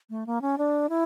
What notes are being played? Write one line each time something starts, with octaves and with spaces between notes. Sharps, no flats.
A3
A#3
C#4
D4
E4